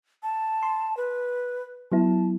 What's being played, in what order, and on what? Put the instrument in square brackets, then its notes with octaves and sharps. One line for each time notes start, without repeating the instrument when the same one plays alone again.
[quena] A5
[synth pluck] C6
[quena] B4
[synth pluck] F#3 B3 E4 [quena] A5